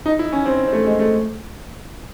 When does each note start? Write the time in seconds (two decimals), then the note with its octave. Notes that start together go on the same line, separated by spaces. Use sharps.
0.06 D#4
0.19 E4
0.32 C#4
0.46 C4
0.67 C4
0.73 A3
0.86 G#3
0.99 A3